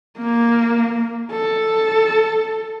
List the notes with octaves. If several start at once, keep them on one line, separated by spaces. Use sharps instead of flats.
A#3
A4